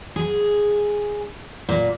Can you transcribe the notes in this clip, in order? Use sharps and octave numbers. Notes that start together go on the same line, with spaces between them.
G#4
A#2